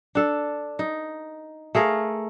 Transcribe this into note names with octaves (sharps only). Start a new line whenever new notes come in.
D4 A4
D#4
A3 G#4 A#4 F5